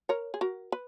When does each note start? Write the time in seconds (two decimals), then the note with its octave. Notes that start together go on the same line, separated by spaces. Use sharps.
0.09 A#4 C#5
0.34 G#4
0.41 F#4 A#4
0.72 B4